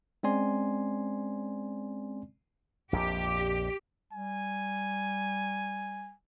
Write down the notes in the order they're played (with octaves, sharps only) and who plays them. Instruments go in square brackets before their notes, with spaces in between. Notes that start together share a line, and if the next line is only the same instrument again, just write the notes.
[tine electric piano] G#3 C4 C#4 D5 G#5 C6
[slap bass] A#1 F2 [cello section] G4
[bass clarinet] G3 [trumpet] G#5